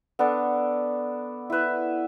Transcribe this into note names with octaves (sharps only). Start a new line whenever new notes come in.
B3 D4 A4 D5
E4 B4 E5